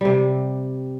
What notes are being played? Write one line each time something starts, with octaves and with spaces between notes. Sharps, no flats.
C3 G3